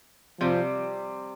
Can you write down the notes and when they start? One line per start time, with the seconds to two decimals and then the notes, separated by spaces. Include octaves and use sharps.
0.40 C3 F3 G3 C4